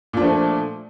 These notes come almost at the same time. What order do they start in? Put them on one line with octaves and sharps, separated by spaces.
A#2 D4 F3 A3